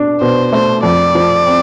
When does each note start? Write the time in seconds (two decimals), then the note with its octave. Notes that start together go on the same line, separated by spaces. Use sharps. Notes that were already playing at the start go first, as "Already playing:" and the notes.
Already playing: B2 D4
0.21 B2 C5
0.52 A3 C5
0.83 F2 D5
1.15 F3
1.46 C4